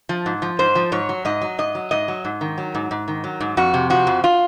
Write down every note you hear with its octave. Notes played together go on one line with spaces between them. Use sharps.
F3
G#2
F3
G#2 C5
F3
G#2 C#5
F#3
G#2 D#5
F#3
G#2 D#5
F#3
G#2 D#5
F#3
G#2
D#3
F#3
G#2
G#2
D#3
F#3
G#2
F2 F#4
C3
F3 F#4
F2
F4